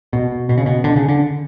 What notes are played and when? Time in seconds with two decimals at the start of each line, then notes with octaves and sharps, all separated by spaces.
0.13 B2
0.49 B2
0.58 C#3
0.66 B2
0.84 D3
0.96 C#3
1.08 D3